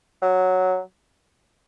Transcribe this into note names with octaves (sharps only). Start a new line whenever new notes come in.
F#3